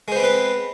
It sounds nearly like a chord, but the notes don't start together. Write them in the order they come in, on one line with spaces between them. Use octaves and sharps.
G#3 C5 B3 C4 B4